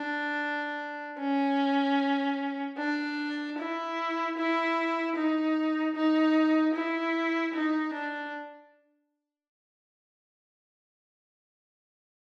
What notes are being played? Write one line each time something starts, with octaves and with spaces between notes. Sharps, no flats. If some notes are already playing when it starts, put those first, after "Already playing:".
Already playing: D4
C#4
D4
E4
E4
D#4
D#4
E4
D#4
D4